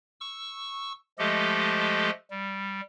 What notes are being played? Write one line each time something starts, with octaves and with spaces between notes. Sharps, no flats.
C#6 E6
F3 G#3 A3 G4 A4 D#5
G3